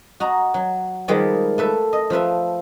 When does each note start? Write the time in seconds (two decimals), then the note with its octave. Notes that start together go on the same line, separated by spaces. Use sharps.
0.20 F#4 D#5 A#5
0.54 F#3
1.08 D#3 F3 G3 G#3 B4 D5
1.58 A3 B4 E5
1.93 D#5
2.10 F3 F4 B4 E5